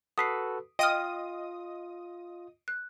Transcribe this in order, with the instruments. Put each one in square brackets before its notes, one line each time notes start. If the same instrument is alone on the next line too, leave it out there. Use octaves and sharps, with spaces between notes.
[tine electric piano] F#4 A4 B4 [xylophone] D#6 B6 C7
[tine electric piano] F4 [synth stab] D#5 D#6 [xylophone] G5 F6
[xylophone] F#6